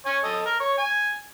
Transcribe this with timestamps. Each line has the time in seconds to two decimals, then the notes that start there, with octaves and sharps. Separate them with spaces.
0.06 C#5 G#5
0.24 A4 D#5
0.46 A#4
0.60 C#5
0.78 G#5